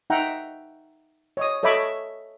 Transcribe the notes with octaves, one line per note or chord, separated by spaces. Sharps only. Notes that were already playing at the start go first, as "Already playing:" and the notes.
D#4 E5 F#5 G5 A#5
C#5 D#5 D#6
A4 C#5 D#5 E5 B5 D6